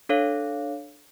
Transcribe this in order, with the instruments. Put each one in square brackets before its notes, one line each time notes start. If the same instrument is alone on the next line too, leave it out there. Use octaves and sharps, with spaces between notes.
[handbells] D4 A4 C#5 F5